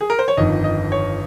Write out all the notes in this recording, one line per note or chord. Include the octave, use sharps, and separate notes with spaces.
G#4
A#4
C5
C#5
G1 F2 D#3 D#5
D#5
C#5